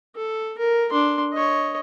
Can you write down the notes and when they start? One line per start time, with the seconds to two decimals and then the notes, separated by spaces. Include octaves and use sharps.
0.16 A4
0.59 A#4
0.91 D4 C6
1.33 C#5 D#5